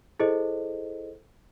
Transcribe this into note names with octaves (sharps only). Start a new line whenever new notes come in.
E4 G#4 A4 C5 D#5